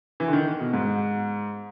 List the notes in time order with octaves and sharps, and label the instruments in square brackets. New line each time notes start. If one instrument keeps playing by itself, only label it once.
[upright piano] E3
D3
D#3
B2
G#2